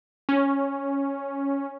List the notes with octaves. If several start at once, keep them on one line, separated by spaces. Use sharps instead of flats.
C#4